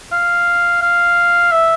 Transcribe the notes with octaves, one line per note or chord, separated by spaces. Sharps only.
F5
F5
E5